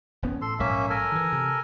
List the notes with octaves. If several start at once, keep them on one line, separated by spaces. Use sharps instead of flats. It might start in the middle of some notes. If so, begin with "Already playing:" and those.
E1 B3 C#4
A2 A4 C6
A#1 G#2 F#3 A#3 C#4 E5
A4 A#4 G#5
D#3 E3
C3